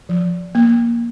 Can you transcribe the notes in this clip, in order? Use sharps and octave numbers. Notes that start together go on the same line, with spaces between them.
F3
A#3